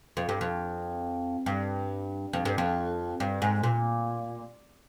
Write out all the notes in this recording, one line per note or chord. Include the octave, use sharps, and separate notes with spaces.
F2
G2
F2
G2
F2
G2
F2
G2
G#2
A#2